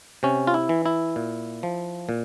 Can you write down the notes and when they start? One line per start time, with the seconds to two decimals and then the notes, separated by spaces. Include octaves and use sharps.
0.23 C3 C#4
0.47 F4
0.54 E4
0.69 E3
0.86 E4
1.16 A#2
1.63 F3
2.09 A#2